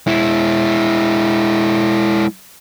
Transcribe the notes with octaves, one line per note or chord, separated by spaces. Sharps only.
G#3 E4